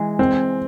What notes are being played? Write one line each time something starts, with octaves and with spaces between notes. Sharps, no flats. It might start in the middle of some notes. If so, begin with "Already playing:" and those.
Already playing: E3 G#3
C4